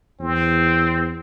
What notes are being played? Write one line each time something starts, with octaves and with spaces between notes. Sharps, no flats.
E2 C4